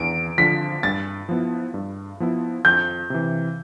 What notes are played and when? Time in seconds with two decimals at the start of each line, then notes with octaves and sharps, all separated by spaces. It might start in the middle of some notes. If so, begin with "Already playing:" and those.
Already playing: E2 D7
0.38 D3 F3 B6
0.83 G2 A6
1.29 F3 B3 E4
1.74 G2
2.20 F3 B3 E4
2.65 F2 G6
3.10 C3 E3